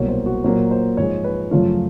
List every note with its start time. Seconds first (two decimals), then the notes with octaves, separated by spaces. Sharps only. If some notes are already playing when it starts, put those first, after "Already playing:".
Already playing: C2 B2 F#3 A#3 C#5
0.09 C5
0.26 F#4
0.44 A#2 F#3 A#3 C5
0.71 C5
0.97 G#2 F3 G#3 C#5
1.24 B4
1.51 F#2 C#3 F3 A3 F4